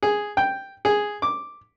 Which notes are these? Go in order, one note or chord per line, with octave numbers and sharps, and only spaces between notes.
G#4
G5
G#4
D6